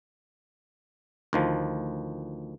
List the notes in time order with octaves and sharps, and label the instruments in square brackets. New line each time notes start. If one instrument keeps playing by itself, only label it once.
[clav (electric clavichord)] D2 D#3 F3